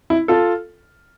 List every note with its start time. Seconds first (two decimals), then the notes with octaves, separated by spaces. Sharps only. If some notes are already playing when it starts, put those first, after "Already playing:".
0.10 E4
0.28 F4 A4